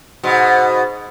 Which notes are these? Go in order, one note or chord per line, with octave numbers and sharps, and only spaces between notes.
G#2 B2